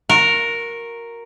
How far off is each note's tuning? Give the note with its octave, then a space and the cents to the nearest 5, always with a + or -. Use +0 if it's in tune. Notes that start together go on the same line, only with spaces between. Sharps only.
F#4 -25 A#4 +0